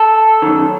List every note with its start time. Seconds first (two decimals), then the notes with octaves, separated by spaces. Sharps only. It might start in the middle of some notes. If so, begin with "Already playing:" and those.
Already playing: A4
0.42 F#2 D#3